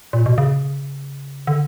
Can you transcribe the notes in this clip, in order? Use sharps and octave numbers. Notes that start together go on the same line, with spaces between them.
A#2
B2
C#3
D3